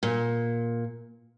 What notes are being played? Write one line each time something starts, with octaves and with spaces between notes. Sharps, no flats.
A#2